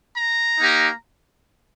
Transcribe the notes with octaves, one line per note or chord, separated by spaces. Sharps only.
A#5
A#3 D#4 G4